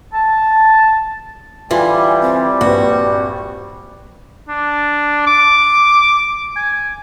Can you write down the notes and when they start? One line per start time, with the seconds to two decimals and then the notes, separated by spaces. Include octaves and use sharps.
0.14 A5
1.71 D3 E3 G3 F4 G#5
2.21 C4
2.61 A#1 G2 F#4
4.49 D4
5.27 D6
6.56 G#5